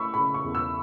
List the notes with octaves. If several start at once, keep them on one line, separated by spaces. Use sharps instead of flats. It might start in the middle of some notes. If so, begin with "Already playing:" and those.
Already playing: A3 E4 B5 C#6 E6
C#3 B5
C#6
E2
E6